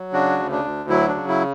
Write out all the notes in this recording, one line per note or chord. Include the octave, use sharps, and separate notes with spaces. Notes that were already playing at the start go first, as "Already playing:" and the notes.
Already playing: F#3
C#3 D4 F#4
D2
D4
D2
F#3 E4
D4
C#3
E4